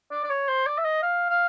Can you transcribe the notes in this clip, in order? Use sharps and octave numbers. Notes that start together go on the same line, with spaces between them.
D5
D5
C#5
C5
D5
E5
D#5
F5
F5